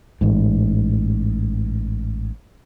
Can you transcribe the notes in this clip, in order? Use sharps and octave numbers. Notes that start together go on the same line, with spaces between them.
A1 G#2